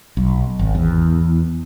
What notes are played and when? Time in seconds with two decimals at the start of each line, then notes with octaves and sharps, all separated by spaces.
0.17 B1
0.59 G#1
0.75 E2